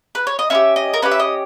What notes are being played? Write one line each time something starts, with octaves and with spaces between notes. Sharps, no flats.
B4
C#5
D#5
C#4 E4 G4 E5
D#5
A#4
C#4 E4 G4 B4
E5
D#5